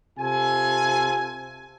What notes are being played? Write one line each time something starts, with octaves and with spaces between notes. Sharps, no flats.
C3 F4 A4 G#5